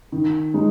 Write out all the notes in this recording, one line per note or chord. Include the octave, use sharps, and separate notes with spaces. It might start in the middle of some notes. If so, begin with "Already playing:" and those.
D#3
G#3 D#4